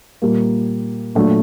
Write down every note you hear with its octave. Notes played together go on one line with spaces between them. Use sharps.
A#2 G3 A#3
A#2 F#3 A3 D4